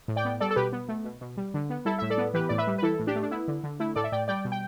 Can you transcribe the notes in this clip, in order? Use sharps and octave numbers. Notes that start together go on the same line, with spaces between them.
A2
D5 G5
B3
G3 A4 D5
A4
B2 G4 B4
B3
A3
B2
B2
G3
D3
B3
G3 E4 A4
A2 E5
A4 D5
B3
E3 G4 B4
A2 D5
B4 E5
G3
B4
E3 E4 A4
A2
D4 G4
A3
D4
B3 E4
D3
D3
A3 E4
A2 A4 D5
E5
A2 D5 G5
G3 D5 G5
B2
G5